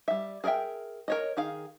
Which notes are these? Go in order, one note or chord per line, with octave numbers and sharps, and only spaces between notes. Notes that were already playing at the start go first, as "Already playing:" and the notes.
G3 E5
G#4 A#4 D5 E5 G5
A#4 C#5 D#5
D#3 G#4 F5